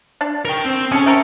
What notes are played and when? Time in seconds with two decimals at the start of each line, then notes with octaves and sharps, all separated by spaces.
0.21 D4
0.45 A#4 G5
0.65 C4
0.92 C#4 G#4 A4
1.06 A3 C4 A#4